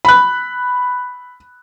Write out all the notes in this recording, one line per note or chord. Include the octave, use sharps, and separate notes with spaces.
B5 F#6